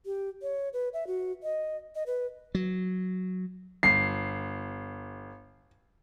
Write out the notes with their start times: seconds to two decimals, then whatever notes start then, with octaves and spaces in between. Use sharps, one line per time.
0.06 G4
0.42 C#5
0.73 B4
0.94 E5
1.07 F#4
1.43 D#5
1.95 D#5
2.07 B4
2.55 F#3
3.83 G1 C7